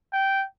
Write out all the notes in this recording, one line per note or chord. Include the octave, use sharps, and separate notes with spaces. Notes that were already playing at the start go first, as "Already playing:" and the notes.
G5